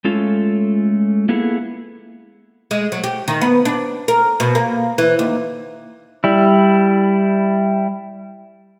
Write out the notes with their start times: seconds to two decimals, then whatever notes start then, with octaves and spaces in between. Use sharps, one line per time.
0.05 G#3 A3 C#4 F4 A4
1.29 A#3 B3 E4 G#4 A4
2.71 G#3
2.92 F#3
3.04 G4
3.28 D#3
3.41 B3
3.65 D4
4.08 A#4
4.40 B2
4.55 A#3
4.98 E3
5.19 D#2
6.24 G3 E4